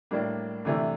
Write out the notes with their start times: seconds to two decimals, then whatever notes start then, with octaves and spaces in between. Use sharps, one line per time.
0.11 A2 G3 A#3 D4
0.65 C3 E3 A3 D4